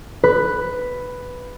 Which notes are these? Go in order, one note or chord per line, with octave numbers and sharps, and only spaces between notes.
B4